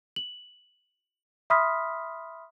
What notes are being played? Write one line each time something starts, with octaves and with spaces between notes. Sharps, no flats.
F#7
E5 B5 C6 D#6 F6 B6